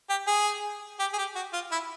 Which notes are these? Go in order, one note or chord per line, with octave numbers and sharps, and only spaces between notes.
G4
G#4
G4
G#4
G4
F#4
F4
E4